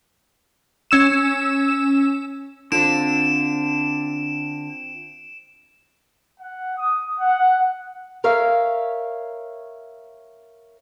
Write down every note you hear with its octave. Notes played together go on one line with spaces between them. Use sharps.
C#4 E6 E7
D3 C4 F4 D7 E7
F#5
D#6
F#5
A#4 C#5 E5 F5